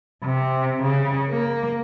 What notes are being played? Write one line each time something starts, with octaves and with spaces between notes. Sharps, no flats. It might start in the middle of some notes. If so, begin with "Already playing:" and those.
C3
C#3
A#3